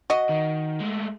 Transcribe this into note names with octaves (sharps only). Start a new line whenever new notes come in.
F#4 D#5
D#3
G#3 A3